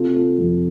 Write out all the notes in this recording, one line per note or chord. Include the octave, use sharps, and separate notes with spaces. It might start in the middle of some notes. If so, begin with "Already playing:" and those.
Already playing: C3 F4 A4
F4 A4
F2